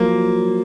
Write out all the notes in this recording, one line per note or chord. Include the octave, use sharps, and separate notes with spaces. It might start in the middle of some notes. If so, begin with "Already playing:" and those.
Already playing: F3 F#3 A#3